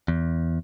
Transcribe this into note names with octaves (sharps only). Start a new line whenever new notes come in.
E2